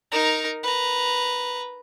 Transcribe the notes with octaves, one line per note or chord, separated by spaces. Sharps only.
D#4 A#4
B4 A#5